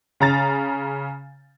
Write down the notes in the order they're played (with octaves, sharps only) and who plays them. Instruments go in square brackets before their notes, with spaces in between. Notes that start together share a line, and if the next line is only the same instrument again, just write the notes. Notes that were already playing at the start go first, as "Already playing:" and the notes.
[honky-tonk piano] C#3 A#5 A6